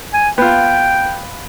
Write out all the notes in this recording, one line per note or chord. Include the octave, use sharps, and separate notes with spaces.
G#5
B3 F4 G5